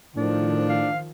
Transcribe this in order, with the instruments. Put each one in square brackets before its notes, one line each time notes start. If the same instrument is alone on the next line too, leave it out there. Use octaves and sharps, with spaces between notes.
[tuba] A2 [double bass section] D#3 F3 [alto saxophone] D4
[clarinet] F5